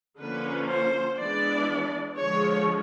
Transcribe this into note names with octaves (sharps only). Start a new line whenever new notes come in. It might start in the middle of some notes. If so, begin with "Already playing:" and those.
D3 F3 A#3 C#4 B4
C5
E3 G#3 B3 D4 D5
D3 F3 G#3 C#5